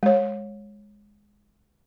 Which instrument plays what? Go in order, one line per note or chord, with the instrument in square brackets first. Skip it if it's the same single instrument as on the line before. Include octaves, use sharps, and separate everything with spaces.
[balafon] G#3 C#5